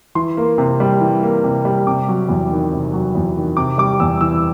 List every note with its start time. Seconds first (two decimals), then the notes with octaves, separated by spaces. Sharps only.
0.15 E3 C6
0.37 A#3
0.58 C3
0.80 G3
1.01 E3
1.23 A#3
1.44 C3
1.65 G3
1.87 C3 D6
2.08 F#3
2.29 E2
2.51 D#3
2.71 C3
2.93 F#3
3.15 E2
3.37 D#3
3.57 C3 D6
3.78 G3 D6
4.00 E2 E6
4.21 E3 E6